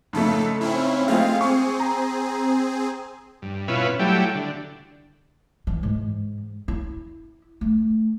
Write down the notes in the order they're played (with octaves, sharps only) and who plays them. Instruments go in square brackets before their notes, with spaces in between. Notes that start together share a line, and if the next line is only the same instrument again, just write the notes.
[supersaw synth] F2 A4 [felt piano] G#2 C#3 A3
[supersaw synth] C4 C#4 E4
[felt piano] G#3 A3 C4 [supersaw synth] F4 G#4 F5
[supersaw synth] C4 G#4 [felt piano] C#6
[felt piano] A#5
[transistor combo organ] G2
B2 C#4 E4 F4 B4
F#3 G3 A3 E4 G4
D3
[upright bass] E3
G#2
E4
A3